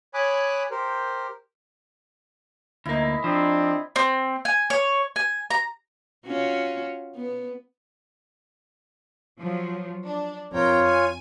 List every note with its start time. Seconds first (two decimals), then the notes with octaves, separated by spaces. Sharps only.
0.14 C#5 G#5 B5 D6 D#6 F#6
0.71 G4 A#4 C5
2.86 D2 A#3 D#4 E4
3.24 F3 C4 D4
3.96 C4
4.45 G#5
4.70 C#5
5.16 G#5
5.51 A#5
6.27 C#4 F4 F#4
7.15 B3
9.40 F3 F#3
10.06 D4
10.53 F2 F4 A#4 C#5 G5
10.85 G#5